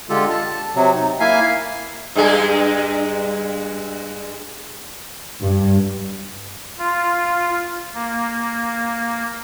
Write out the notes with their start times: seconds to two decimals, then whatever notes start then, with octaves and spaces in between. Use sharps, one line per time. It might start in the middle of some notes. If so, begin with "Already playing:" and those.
0.10 D3 G#3 F4 G4 A4
0.30 A5
0.75 C3 F#3
0.94 D#4
1.20 A#3 E4 E5 F5 G#5
2.15 G2 G#3 G#4
5.42 G2
6.79 F4
7.94 A#3